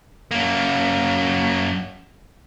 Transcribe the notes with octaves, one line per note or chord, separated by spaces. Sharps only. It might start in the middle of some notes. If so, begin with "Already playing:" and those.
F#2 A#3